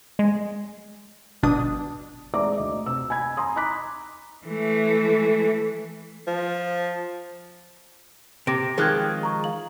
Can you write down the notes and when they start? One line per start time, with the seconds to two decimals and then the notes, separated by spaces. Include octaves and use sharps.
0.19 G#3
1.43 G1 B2 D4 D#6
2.34 G#3 C4 D5 E5 A#5 D6
2.58 D2 D#5
2.86 C3 E6
3.10 G#5 B5 G#6
3.37 G#5 A#5 C6 D#6
3.56 A#5 B5 D6 F#6 B6
4.46 E3 A3
6.27 F3
8.47 C3 D6 A#6 D7
8.78 D#3 F3 G#3 G#4 F#6 G#6
9.23 A#5 C#6
9.44 F5 F#7